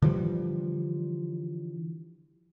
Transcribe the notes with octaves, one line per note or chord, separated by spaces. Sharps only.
D3 E3 F3 G3